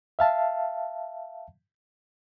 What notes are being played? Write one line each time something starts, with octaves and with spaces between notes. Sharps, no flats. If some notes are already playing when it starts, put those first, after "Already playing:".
E5 F5 A5